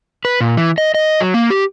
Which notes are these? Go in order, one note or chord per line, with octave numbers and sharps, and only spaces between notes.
B4
A#2
E3
D#5
D#5
F#3
A#3
G4